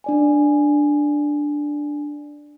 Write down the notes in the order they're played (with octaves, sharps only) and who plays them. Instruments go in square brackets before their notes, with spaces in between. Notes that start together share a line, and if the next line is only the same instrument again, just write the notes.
[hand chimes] D4 D5 G#5